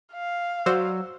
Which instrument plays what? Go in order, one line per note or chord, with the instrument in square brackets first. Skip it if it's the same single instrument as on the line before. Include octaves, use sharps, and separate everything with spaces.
[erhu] F5
[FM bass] F#3 [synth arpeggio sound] F#4 C5 D5 [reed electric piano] E6